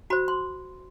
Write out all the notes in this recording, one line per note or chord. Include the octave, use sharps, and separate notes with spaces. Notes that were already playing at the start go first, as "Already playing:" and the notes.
F#4 C5 B5
C6